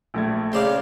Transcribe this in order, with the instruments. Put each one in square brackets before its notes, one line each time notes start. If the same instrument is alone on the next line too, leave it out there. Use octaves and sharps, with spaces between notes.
[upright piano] A#1 A3 G#6
[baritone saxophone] C#3 [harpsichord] C5 D5 F5